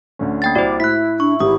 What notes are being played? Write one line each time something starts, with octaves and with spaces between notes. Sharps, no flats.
D2 D3 C#4
A#3 G5 A6
C2 F#4 C5 D5
A2 E4 F#6 B6
D4 C#6
G#1 G4 D#6